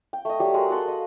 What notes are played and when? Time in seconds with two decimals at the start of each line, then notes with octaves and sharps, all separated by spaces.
0.13 G5
0.25 A3 D#5
0.40 F#3 G3 G4
0.54 G#3 F#4 A#4 F#5
0.69 F#4 A4 F#5 C6
0.88 D#5 F5